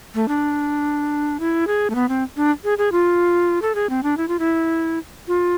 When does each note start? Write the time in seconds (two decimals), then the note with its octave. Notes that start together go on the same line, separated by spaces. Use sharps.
0.15 A3
0.28 D4
1.40 E4
1.67 G#4
1.90 A3
1.95 B3
2.09 C4
2.37 D4
2.64 G#4
2.78 G#4
2.92 F4
3.62 A4
3.75 G#4
3.90 C4
4.03 D4
4.17 E4
4.28 F4
4.39 E4
5.28 F4